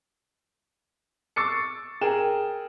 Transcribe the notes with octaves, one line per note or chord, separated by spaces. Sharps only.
C#6 D6 E6 A6 C7 C#7
G#4 A#4 G5 E7